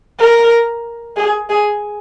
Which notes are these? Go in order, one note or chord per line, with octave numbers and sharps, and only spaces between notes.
A#4
G#4
G#4